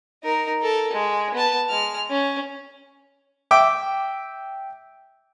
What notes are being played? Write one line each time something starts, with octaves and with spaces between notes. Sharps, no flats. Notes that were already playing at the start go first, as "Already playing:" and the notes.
D#4 A#4
A4 A#4
G#3
B3 A5
G#3 F6
C#4
E5 G5 D6